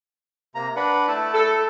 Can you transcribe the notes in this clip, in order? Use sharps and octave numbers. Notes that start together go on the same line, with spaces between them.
C3 A#3 A#5
D4 B4 F#5
A3 E4 A5
A4